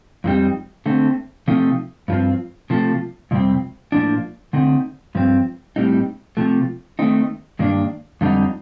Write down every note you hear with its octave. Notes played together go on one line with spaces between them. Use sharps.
F2 D3 G3 C4 D#4
D3 A3 C4
C3 F3 A3 C4 D#4
G2 F3 C4
C3 F3 A3
F2 C3 G3 C4
A2 F3 A#3 D4
D3 A3 C4 D#4
G2 F3 C4
A2 G3 C4 D#4
C3 F3 A3
D#3 A3 C4 D#4
G2 D#3 A#3 D4
F2 D3 G3 C4 D#4